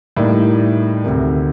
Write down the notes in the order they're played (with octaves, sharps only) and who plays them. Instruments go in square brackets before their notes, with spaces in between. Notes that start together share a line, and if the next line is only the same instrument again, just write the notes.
[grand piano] A2 G3 A#3 D#4
D2 C3 D#3